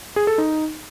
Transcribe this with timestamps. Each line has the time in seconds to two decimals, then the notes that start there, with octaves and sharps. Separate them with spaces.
0.16 G#4
0.27 A4
0.38 D#4